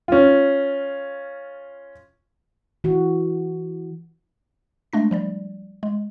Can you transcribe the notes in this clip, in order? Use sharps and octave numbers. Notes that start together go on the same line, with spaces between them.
C#4 F4
E3 F#4
G#3 A3 D4 A#6
F3 G3 D5
G#3